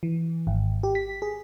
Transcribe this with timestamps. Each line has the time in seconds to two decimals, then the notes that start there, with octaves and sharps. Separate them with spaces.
0.03 E3
0.47 G#1
0.83 G4
0.95 B6
1.22 G#4